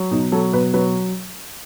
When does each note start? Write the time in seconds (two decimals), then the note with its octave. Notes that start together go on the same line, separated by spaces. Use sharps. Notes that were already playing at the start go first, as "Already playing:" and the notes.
Already playing: F#3
0.11 B2 D#4
0.32 F#3 A4
0.54 B2 B4
0.74 F#3 B4